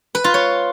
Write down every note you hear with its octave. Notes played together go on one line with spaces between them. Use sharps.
B4
F4
C#5